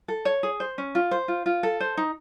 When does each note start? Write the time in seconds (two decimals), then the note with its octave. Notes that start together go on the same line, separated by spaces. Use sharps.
0.08 A4
0.25 C#5
0.43 G#4
0.60 C5
0.78 C#4
0.95 F4
1.11 C5
1.28 F4
1.46 F4
1.63 A4
1.80 C5
1.97 D#4